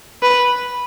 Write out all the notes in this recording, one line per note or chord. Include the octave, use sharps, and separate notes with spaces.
B4